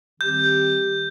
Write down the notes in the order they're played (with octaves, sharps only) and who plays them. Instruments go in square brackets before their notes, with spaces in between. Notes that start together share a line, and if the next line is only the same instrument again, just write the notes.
[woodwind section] D#3 G3 C4 G4 [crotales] G6